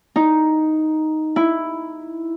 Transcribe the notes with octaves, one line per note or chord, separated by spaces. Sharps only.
D#4
E4